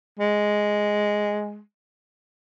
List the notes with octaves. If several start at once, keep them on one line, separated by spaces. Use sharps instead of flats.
G#3